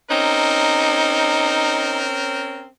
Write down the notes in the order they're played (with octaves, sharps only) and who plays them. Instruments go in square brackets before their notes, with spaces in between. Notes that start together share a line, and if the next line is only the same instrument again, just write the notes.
[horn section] C4 C#4 A#4 [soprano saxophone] D#4